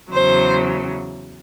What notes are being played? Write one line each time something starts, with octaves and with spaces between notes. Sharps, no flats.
E2 C#3 F#3 C5